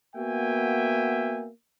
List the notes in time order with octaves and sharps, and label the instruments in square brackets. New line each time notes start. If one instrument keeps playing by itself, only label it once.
[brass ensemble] A#3 B3 F#4 E5 G5 G#5